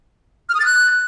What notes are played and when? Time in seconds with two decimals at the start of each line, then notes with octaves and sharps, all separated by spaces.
0.49 F6
0.55 D#6
0.60 A6
0.65 F#6